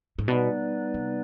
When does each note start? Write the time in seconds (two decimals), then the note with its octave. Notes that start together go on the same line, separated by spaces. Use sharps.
0.19 G#2
0.28 B2 G3 B3 D#4 B4 D5
0.94 C3